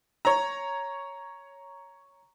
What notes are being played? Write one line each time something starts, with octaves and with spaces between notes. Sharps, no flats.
C#5 A#5